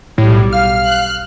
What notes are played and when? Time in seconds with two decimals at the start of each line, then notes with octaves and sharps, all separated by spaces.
0.18 B1 A2 G3
0.53 F5 F6
0.85 F#6